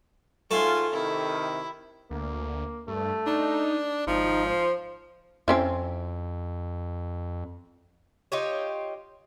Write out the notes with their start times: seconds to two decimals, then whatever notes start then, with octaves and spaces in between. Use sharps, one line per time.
0.51 G#1 G#2 A3 F4 G#5 C6
0.92 C3 D#3 E4
2.11 D2 A#3
2.88 G2 A3
3.26 D4 D#4
4.07 G#1 F3 D#4
4.46 C5
5.48 F2 C4 C#4 E4
8.32 D#4 F4 G4 C#5